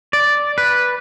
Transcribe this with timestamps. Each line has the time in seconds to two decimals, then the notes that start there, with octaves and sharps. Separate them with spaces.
0.13 D5
0.58 B4